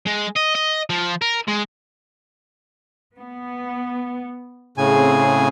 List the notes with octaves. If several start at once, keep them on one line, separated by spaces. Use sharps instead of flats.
G#3
D#5
D#5
F3
A#4
G#3
B3
A2 C#3 C4 G#4 G#5